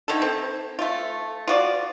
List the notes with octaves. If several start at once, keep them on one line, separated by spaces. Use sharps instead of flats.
D3 D#3 E4 A4
C4
A3 F4
F4 F#4 D5